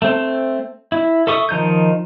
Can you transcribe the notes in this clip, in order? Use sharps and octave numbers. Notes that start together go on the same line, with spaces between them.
A3 C4
E4
A4 E5 C#6 D#6
D#3 F3 D#4 G6